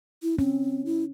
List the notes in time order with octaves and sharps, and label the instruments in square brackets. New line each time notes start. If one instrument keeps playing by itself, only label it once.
[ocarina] E4
[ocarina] C4 [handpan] C#4
[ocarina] E4